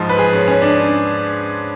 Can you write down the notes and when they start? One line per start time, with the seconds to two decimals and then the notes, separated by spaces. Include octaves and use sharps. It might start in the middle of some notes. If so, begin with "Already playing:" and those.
Already playing: G#2 F3
0.09 B4
0.19 G#4
0.33 C#4
0.48 C#4
0.62 D4